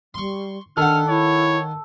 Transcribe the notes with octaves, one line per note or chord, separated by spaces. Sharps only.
G3 C6 C#6
D#3 D4 A4 F#5 F6
E4 C#5